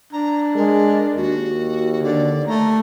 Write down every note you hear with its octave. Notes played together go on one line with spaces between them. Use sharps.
D4 A#5
G#3 A#4
D#2 F#4
D3 D5
A3 A#5